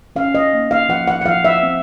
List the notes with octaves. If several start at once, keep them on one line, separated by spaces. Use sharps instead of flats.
C#4 F5
D#5
A#3
F5
F3 F#5
F#5
F#5
F3 F5
E5
C4